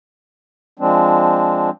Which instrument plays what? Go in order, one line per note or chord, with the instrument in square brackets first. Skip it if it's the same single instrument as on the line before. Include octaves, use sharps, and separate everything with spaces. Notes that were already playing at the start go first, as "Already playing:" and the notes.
[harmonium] F3 G#3 C4 D4